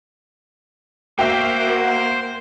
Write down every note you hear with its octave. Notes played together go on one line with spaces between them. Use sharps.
A#3 F#4 C5 E5 G5